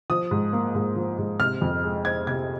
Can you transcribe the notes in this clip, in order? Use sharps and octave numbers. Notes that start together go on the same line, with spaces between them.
F3 D#6
G#2
A#3
G#2
F3
G#2
C3 F6
F2
G#3
C4 G#6
C3 G#6